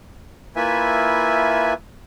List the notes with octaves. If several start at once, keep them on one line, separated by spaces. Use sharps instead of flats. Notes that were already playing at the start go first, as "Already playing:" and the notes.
A#3 E4 F4 B4 E5 G#5